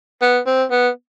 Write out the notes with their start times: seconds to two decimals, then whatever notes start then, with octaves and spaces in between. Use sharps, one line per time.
0.22 B3
0.46 C4
0.71 B3